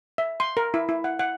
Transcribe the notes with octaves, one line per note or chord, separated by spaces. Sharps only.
E5
C6
A#4
E4
E4
F#5
F#5